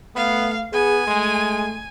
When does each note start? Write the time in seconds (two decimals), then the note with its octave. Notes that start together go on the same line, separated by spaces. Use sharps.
0.16 A3 B3 F5
0.73 B3 G#4 G#5
1.07 G#3 A3